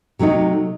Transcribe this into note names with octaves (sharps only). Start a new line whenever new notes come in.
C3 F#3 A3 D#4